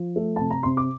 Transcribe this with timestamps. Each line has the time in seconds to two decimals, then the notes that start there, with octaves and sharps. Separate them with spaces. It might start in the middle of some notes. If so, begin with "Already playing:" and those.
Already playing: F3
0.16 A3
0.36 C3 A5
0.50 A#5
0.63 C3 C6
0.77 D6